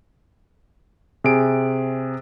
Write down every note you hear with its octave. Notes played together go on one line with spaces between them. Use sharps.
C3 G#4 D7